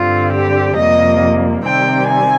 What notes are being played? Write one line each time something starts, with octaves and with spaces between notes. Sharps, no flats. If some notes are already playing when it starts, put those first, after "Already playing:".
Already playing: G2 D3 G3 C4 F4
G4
F2 C3 G3 A#3 D#5
C3 D#3 G3 C4 G5
G#5